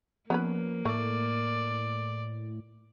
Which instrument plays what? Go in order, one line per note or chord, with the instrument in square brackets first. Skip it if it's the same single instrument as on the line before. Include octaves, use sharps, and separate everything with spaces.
[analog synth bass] F3 [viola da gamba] A#3 [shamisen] B3 C#4 B4
[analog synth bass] A2 [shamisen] A3 [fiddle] D5